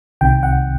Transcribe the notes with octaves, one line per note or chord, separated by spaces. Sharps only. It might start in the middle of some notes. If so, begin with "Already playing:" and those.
C2 C3 D#3 G5
F#5